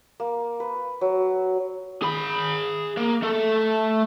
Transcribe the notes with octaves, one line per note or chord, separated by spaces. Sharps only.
A#3
B4
F#3
G#4 B5
A#3
A3 A4